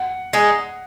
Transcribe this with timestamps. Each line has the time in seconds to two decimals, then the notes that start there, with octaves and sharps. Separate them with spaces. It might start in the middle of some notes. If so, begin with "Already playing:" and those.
Already playing: F#5
0.33 G#3 D#4